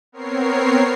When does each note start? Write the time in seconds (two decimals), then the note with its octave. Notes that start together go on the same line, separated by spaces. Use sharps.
0.12 B3 C4 A#4 C#5 C7